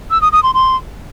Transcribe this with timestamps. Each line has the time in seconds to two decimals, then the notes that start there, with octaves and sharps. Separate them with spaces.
0.11 E6
0.22 D#6
0.32 D#6
0.43 C6
0.54 C6